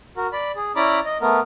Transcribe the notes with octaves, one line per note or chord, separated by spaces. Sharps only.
F#4 A#4
D5 B5
G#4
C#4 E4 D5 A#5 B5 D6
D#5
A3 B3 A#4